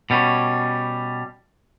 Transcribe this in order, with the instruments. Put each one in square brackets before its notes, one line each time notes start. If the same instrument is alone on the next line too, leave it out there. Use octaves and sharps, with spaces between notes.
[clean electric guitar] B2 G3 C#4